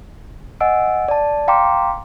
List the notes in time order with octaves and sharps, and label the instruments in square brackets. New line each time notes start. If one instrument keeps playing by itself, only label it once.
[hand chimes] D#5 F#5 G#5 E6 D7
D5 A5
F5 G5 A#5 C6 D6